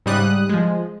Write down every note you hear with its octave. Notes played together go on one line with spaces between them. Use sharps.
G#2 C#3 G3 D#6 F#6
F3 G#3